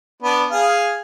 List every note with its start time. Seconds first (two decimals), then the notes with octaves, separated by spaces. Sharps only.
0.23 B3 D4
0.51 G#4 F5